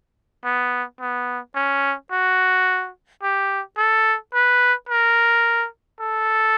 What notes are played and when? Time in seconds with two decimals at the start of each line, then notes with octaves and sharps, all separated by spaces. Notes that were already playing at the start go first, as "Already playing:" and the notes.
0.44 B3
1.00 B3
1.55 C#4
2.11 F#4
3.22 G4
3.77 A4
4.34 B4
4.89 A#4
6.00 A4